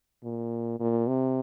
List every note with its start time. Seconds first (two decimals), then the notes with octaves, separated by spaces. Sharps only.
0.24 A#2
0.80 A#2
1.08 C3